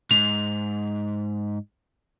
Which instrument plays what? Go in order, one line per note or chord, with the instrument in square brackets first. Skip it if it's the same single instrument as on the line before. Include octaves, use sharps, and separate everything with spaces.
[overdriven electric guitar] G#2 [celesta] F7